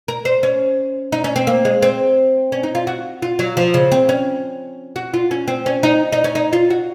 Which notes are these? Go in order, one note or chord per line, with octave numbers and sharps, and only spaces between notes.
A#4
C5
C#4
D#4
C#4
C4
A#3
G#3
C4
C#4
D#4
F4
F#4
F4
F#3
F3
C#3
C4
C#4
F#4
F4
C#4
C4
C#4
D#4
D#4
C#4
D#4
F4
F#4